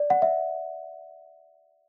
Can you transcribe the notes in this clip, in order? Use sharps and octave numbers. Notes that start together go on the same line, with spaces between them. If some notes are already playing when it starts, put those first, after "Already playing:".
Already playing: D5
F#5
E5